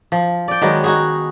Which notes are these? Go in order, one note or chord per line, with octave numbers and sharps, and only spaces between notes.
F3
D5 G5
D#3 F#3 G#3 B3
D#4 F#4 G#4